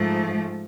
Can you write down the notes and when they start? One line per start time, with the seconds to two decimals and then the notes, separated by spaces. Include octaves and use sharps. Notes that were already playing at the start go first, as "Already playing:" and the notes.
Already playing: G#2 F3 A3